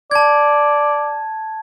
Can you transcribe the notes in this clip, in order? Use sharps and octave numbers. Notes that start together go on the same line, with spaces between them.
D5 A5 G#6